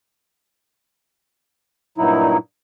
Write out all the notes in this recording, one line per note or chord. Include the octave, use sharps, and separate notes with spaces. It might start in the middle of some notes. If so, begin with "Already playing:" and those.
G2 A#2 F#3 D#4 E4